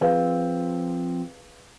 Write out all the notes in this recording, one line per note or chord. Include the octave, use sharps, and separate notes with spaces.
F3 C4 G#4 B4 F5